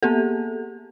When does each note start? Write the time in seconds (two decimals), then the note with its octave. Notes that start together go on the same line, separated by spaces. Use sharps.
0.03 A#3 B3 G4 A4